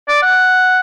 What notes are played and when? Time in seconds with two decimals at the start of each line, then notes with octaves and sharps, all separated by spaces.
0.08 D5
0.23 F#5